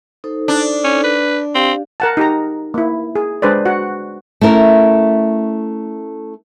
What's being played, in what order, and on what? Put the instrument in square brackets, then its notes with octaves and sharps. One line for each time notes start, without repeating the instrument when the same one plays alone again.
[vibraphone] D#4 A4 C5
[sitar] D4
[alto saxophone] C#4
B4
[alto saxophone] C4 [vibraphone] G4 F5
[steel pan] A#4 F#5 A5
D#4 G4 A#5
A#3 E4
G#4
G#3 D4 G#4 B4 C5 D5
F#4 F#5
[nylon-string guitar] A3 C#4 E4 A#4